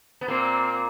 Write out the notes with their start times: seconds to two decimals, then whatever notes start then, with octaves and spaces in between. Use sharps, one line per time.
0.21 B3
0.28 A#2 A#3 C4